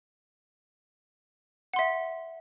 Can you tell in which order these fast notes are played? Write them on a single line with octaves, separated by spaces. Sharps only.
F#5 C6 E5